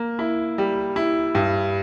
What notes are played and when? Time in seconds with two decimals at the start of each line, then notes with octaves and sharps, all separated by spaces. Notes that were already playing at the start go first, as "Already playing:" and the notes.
Already playing: A#3
0.19 E4
0.58 G3
0.96 E4
1.35 G2